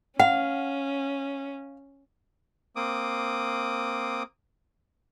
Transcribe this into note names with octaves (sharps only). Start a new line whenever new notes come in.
C#4 F5 F#5
A#3 C4 D6 D#6